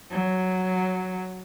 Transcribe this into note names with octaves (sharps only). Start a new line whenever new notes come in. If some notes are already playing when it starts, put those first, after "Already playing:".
F#3